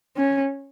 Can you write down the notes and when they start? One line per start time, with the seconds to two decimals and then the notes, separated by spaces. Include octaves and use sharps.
0.17 C#4